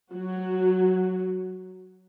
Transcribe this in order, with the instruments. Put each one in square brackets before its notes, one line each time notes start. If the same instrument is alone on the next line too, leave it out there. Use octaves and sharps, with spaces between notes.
[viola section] F#3 F#4